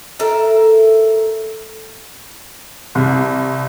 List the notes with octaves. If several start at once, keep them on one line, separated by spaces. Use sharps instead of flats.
A4 A#4 E5
C2